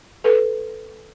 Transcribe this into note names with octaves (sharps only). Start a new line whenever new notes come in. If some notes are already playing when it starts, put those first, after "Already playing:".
A4 B4